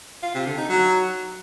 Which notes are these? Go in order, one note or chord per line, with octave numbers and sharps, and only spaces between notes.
F4
C3
D3
D#4
F#3